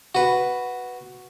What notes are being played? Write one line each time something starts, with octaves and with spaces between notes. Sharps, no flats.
F#4 B4